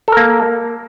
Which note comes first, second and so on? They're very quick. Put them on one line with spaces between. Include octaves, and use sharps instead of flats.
A4 A#4 A#3